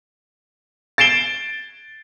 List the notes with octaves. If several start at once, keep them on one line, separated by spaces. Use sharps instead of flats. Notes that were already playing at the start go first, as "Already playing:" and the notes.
A6 C7 D7 E7 G7